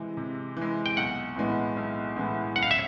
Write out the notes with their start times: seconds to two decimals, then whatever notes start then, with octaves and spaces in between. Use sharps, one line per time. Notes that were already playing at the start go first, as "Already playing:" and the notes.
Already playing: C3 E3 G#3
0.17 C3
0.57 E3 G#3
0.86 G5
0.97 B1 F#5
1.36 A2 E3 G#3 B3
1.77 B1
2.16 A2 E3 G#3 B3
2.55 F#1 F#5
2.63 F5
2.71 E5